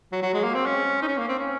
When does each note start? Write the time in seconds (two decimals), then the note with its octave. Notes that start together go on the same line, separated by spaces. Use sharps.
0.12 F#3
0.22 F#3
0.34 G#3
0.44 A#3
0.54 C4
0.66 C#4
1.02 D#4
1.08 C#4
1.18 A#3
1.29 C4
1.38 C#4